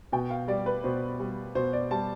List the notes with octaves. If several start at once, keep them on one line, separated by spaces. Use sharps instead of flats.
B2 G5
F5
G3 D5
B4
B2 C5
G3
B2 C5
D5
G3 A5